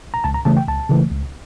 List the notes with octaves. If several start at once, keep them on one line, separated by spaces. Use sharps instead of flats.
A#5
C#2 A5
A#5
C#3 E3 A3 A5
G5
C#2 A5
C#3 E3 A3
C#2